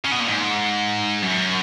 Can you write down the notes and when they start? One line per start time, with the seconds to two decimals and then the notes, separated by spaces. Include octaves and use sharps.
0.04 C#3
0.11 B2
0.20 A#2
0.27 G#2
1.22 F#2